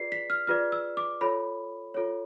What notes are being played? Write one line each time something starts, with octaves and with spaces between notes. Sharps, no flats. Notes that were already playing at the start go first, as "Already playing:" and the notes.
Already playing: F4 G#4 B4 D5 C7
B6
F6
F4 G#4 B4 D5 F6
E6
D6
F4 A4 C#5 B5
F4 A4 C#5